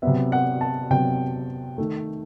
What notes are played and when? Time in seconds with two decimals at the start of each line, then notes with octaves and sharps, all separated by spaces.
0.02 C3 F#3 B3 E5
0.32 F#5
0.61 A5
0.90 C3 F#3 B3 G5
1.78 D#3 A3